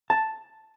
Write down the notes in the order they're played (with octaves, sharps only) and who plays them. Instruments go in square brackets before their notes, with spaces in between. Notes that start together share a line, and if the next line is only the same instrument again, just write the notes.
[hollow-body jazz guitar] A5